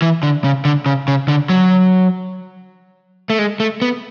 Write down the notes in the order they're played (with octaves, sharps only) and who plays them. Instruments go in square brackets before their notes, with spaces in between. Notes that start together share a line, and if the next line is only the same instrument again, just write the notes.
[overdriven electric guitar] E3
D3
C#3
D3
C#3
C#3
D3
F#3
A3
G#3
A3
B3